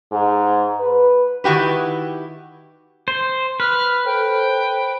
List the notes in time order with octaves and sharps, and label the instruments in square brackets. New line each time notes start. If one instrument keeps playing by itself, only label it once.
[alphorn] G#2
B4
[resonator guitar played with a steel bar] D#3 E4 F#4 G4 B4
[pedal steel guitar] C5
[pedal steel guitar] B4 [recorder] F6
[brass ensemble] A4 C5 [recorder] G5